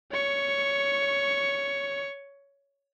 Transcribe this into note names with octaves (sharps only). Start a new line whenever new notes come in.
C#5 C#6